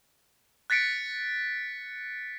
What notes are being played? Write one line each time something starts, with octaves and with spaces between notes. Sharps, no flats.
F#6 A6 B6 C#7 D7